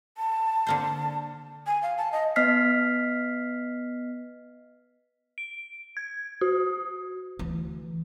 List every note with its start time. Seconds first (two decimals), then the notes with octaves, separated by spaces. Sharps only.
0.17 A5
0.67 D3 A#3 C5
1.66 G#5
1.82 F5
1.97 A5
2.12 D#5
2.36 B3 D#5 F6 B6 C7
5.38 D7
5.97 G#6
6.41 F#4
7.39 D2 E3